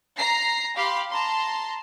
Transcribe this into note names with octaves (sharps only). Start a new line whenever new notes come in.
A#5 A#6 C7
G4 F5 B5 C6
A5 A#5 C6